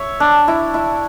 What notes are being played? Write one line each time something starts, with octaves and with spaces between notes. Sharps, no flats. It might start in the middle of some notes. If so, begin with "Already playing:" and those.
Already playing: C#5 E5
D4
E4
E4